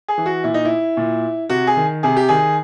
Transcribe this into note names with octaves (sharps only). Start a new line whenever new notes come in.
G#4
E3
F#4
A#2 E4
D#4
E4
A#2
C3 F#4
G#4
D#3
C3 G#4
G4
D#3 G#4